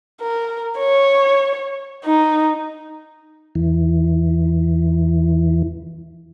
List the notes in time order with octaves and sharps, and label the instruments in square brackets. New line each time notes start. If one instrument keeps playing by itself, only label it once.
[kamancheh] A#4
C#5
D#4
[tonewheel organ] E2 E3